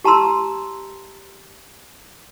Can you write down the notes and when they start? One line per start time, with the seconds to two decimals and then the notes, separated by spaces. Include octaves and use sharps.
0.04 G4 A5 A#5 C6 E6